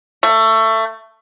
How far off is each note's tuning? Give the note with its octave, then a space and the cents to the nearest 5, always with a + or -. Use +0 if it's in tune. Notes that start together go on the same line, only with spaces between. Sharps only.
A3 +20